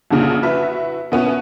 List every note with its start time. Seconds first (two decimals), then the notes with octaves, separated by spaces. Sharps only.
0.11 C2 F2 A#2 C#3
0.42 E4 F#4 B4 E5
1.12 B2 B3 C#4 E4